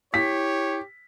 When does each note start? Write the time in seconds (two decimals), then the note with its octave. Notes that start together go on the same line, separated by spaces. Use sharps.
0.14 E4 G4 C#5 B6